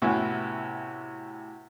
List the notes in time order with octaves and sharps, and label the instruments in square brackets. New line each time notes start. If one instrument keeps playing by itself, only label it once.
[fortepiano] A2 C3 B3 C#4 E4 F#4